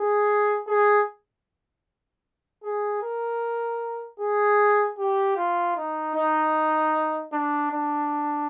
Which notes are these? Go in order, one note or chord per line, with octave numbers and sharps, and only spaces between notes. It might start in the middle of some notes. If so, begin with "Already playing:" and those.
Already playing: G#4
G#4
G#4
A#4
G#4
G4
F4
D#4
D#4
D4
D4